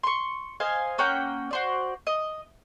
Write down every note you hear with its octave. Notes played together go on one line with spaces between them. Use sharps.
C6 C#6
C5 D#5 F5 G#5
A#3 C#4 F#5 G5
F#4 C5 D5
D#5